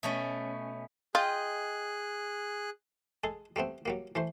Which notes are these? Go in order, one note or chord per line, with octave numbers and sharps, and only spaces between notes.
B2 A3 C#4
F4 G#4 D#5 G5 F#6
G#3 G#4 A4
G3 A3 B3 C4
F#3 G3 A#3
E3 A3 C5